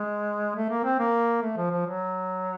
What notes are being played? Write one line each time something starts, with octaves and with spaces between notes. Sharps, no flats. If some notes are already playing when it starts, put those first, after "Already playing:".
Already playing: G#3
A3
A#3
C4
A#3
A3
F3
F3
F#3